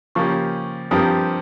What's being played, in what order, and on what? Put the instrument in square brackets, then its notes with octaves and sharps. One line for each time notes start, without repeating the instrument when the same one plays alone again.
[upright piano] C#3 F3 A#3 C#4 G4 [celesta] C#6
[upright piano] G2 F3 C4 G4 A#4 [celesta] D#6